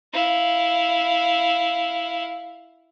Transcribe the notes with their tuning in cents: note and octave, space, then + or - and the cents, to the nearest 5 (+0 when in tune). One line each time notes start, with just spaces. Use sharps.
E4 +0 F5 +0